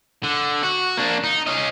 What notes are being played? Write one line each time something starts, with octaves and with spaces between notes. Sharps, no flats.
D3
F#4
A#3 D4
D#4
C#4 D#5